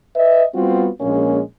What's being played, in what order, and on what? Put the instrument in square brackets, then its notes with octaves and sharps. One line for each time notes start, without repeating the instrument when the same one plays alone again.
[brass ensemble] B4 D#5 E5
G3 B3 C4 F4 F#4
A#1 G#3 A#3 C#4